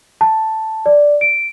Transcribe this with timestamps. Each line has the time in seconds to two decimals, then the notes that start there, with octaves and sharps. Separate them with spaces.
0.21 A5
0.86 D5
1.21 D7